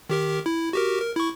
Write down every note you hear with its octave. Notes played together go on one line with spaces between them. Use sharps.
D#3 G4 A#4
E4
F#4 G4 A#4
A#4
E4 C#6